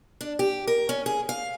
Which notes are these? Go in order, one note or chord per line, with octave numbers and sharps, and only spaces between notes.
D4
G4
A#4
C#4
G#4
F5